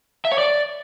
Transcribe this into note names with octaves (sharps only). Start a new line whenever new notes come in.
E5
C#5
D5